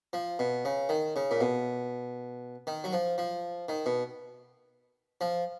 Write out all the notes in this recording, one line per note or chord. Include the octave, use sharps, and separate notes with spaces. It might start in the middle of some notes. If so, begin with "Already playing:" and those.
F3
B2
C#3
D#3
C#3
A#2
B2
D#3
F#3
F3
F3
D#3
B2
F3